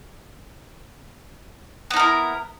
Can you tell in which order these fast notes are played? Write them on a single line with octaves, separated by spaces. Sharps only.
B3 D#4 A#4 E4